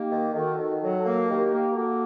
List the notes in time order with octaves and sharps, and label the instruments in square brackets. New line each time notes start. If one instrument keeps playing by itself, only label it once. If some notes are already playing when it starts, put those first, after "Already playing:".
Already playing: [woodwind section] A#3 [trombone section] D#4 G4
[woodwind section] D#3
[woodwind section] D#3 [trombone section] F#4 A4
[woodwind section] D#3
[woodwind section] F#3 [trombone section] F#4 A4
[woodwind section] A#3
[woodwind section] D#3 [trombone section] G4 A#4
[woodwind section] A#3
[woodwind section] A#3 [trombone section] F#4 A4